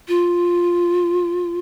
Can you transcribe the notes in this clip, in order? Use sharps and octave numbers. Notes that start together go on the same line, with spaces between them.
F4